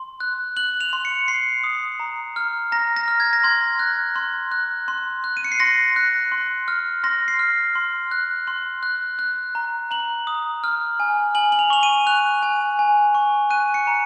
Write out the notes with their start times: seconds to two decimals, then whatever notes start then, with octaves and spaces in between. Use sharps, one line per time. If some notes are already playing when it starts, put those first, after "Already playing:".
Already playing: C6
0.20 F#6
0.57 F#6 F#7
0.81 F7
0.93 C6
1.05 C#7
1.28 C6 C7
1.64 D#6
2.00 A#5
2.36 F6
2.72 A#5 A#6
2.96 A#6
3.08 F6
3.20 G#6
3.33 A#6
3.44 C6 G#6
3.79 F#6
4.16 C6
4.52 F#6
4.88 C6
5.24 F#6
5.37 D#7
5.44 C#7
5.52 C7
5.60 C6 A#6
5.96 F#6
6.32 C6
6.68 F6
7.04 C6 A#6
7.28 C7
7.39 F6
7.75 C6
8.11 F#6
8.47 C6
8.83 F#6
9.19 F#6
9.55 A#5
9.91 A#5 F#7
10.27 D#6
10.64 F6
11.00 G#5
11.35 G#5 F#7
11.52 F#7
11.59 F7
11.70 C#6 F7
11.83 D#7
12.07 F#6 F7
12.43 G#5
12.79 G#5
13.15 C#6
13.50 F#6 D#7
13.74 C#7
13.87 A#5